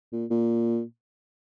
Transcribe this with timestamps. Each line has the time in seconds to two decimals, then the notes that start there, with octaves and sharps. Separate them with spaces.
0.12 A#2
0.31 A#2